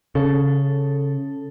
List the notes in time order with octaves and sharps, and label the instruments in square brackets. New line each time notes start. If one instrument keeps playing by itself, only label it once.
[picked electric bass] C#3 [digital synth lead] A4